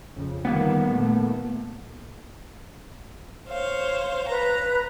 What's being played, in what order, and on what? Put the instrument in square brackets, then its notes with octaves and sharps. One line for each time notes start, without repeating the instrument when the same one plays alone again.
[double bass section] F2 C#3
[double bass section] D3 D#3 G3 [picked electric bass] A#3 B3
[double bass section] A#2 D#3 A3
[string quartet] C5 C#5 F5
[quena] B4 [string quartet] A#5